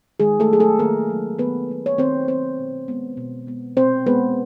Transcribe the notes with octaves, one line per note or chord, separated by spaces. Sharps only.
D#3 G#3 G#4
A3 A4
F#3 B3 G#4
A3 A4
D#3 A#3 A#4
F#3 B3
D#3 B3 B4
F#3 B3
C#5
D#3 C4 C5
F#3 B3 C4 C5
B2
G#3 B3
B2
G#3 B3
B2 C4 C5
G#3 B3 B4